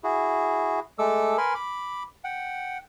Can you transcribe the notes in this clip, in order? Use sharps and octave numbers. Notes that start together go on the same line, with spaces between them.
E4 F#4 G#4
G#3 A3 A4 D6 E6
A#4 B4 G#5 B5 C6
B5 D6
F#5 G5